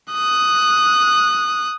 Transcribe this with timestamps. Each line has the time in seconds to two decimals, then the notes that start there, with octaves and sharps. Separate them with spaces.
0.12 D#6 F#6